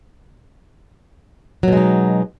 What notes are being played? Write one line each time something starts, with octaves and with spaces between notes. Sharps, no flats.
B2 F#3 G#3 D#4